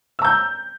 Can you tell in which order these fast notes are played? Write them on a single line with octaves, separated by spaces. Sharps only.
E6 A#5 G6